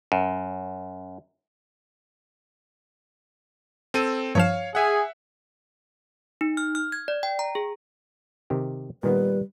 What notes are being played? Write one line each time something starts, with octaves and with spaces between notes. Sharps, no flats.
F#2
C4 A4 D#7
G2 F3 C#5 F5 E7
G#4 E5 F#5
D#4
F6
F6
G#6
D5
G5
A#5
G#4
C3 D#3 G4
A#2 D#3 G3 B3 B4